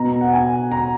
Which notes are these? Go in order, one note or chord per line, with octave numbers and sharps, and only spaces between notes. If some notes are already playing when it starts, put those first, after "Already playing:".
Already playing: B2 A#5
F#5
G#5
A#5